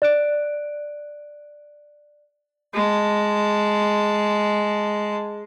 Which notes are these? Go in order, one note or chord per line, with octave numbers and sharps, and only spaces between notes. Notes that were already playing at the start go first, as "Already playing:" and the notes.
D5 F#6 D7
G#3 A5